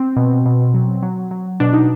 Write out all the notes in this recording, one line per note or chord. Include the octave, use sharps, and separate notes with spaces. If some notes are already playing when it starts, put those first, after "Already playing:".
Already playing: C4
B2
B2
F#3
F#3
F#3
B2 D4
D#4